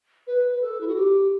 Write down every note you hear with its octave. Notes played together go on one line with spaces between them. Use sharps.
B4
B4
A4
E4
F#4
G4